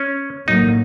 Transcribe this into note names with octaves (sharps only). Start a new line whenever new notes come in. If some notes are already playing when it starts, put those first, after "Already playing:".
Already playing: C#4
A2 F#3 A#3 D#4